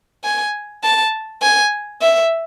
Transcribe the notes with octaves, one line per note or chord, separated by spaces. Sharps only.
G#5
A5
G#5
E5